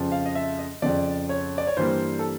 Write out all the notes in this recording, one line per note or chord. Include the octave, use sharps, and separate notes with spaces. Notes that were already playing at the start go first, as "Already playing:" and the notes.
Already playing: F2 C#3 F3
F5
D#5
E5
D#5
F2 C#3 F3 D5
C#5
D5
C#5
G2 E3 G3 A#3 C5
A4